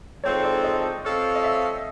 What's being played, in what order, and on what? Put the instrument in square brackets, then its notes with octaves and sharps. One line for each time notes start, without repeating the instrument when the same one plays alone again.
[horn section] D#3 G#3 C4 F4 A4 [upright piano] C#5
[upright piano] D5
D#5
[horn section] C4 F4 A4 C#5 F5
[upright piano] D#5
E5